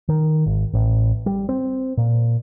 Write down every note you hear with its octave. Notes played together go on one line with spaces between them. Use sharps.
D#3
G#1
A1
G3
C4
A#2